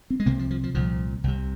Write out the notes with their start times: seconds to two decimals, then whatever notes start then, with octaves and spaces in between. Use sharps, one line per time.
0.10 C4
0.20 G#3
0.26 C2 C3 A#3
0.39 F3
0.51 F3
0.64 F3
0.75 C2 A#2 F3
1.24 C2 C3